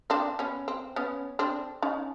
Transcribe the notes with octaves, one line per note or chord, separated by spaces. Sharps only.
C4 D4
B3 C#4
C4
B3 C#4
C4 D4
C#4 D#4